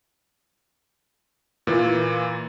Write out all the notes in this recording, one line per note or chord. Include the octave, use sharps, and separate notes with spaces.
A#2 E3